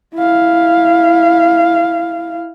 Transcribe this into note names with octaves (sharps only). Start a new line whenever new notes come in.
E4 F5